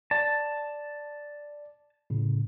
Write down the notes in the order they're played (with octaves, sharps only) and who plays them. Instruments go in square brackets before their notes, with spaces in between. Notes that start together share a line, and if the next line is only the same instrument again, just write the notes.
[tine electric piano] D5 [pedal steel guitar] A5
[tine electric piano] A2 C#3